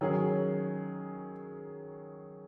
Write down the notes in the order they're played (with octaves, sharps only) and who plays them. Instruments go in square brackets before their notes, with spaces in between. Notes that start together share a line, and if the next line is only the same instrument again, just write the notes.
[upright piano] D#3 F#3 C#4 G#4